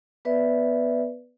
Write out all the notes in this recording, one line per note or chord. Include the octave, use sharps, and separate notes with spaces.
B3 B4 D5 E5